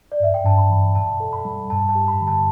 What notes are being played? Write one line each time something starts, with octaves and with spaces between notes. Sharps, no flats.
D5
G2 E5
G5
G2 A5
B5
E3
B2 A5
A4
B5
G3
G2 A5
A5
G4
B5
D3
A5